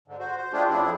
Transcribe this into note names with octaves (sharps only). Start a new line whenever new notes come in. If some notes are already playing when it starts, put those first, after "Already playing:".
G#2 D3
F#4 C5
C5
G#3 A3 D4 F4 G4 G#4
F2 C#3 F3 A3 D4 E4
E4 G#4